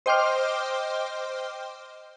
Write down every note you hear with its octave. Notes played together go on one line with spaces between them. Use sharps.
C5 D#5 G5 C6 D6 F6